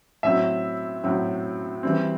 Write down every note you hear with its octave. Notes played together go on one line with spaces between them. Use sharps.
A2 F#3 C4 E5
A2 F#3 C4
E3 G3 C4